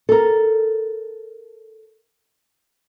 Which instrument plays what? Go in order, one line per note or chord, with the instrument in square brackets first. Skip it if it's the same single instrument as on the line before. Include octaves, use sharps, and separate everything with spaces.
[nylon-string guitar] A4 A#4